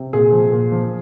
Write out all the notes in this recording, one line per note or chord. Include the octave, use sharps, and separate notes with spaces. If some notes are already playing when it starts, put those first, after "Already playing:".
Already playing: C3
A#2 G#4
F3
A#2
F3